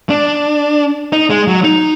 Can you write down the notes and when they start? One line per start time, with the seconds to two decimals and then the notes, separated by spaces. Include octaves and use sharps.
0.10 D4
1.12 D#4
1.30 G#3
1.47 F#3
1.64 D#4